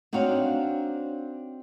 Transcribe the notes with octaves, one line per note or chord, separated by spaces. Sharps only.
C4 D4 D#4 F#4 C#5 F5